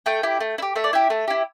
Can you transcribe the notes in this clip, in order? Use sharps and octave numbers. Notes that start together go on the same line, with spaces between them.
A3 G5
E4 G4
A3
E4
G4
A3 E5
D5
E4 G4 E5
A3
E4 G4